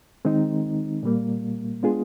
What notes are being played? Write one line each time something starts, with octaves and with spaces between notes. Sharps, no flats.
D#3 G#3 C4 D#4
A#2 G3 A#3
G#3 B3 D4 F4 G#4